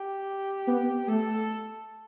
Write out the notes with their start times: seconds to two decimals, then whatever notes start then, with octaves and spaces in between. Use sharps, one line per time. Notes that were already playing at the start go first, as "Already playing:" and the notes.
Already playing: G4
0.68 B3
1.08 A3 A4